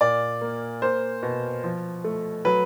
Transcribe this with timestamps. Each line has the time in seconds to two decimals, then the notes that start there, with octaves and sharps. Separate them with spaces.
0.01 A#2 D5
0.41 A#3
0.82 A#3 C5
1.23 B2
1.63 F3
2.04 A3
2.45 F#3 B4